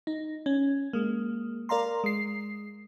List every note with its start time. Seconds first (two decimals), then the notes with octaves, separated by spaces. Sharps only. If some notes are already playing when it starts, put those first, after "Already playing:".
0.07 D#4
0.46 C#4
0.93 G#3 A#3
1.69 A#4 D5 F5 A#5 C6
2.04 G#3 C7